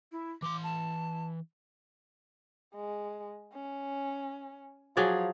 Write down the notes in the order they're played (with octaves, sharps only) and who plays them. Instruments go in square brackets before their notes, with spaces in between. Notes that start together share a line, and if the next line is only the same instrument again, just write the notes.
[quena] E4
[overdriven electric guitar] E3 C6 [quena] D6
[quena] A5
[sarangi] G#3
C#4
[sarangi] F3 [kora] F#3 G#4 D5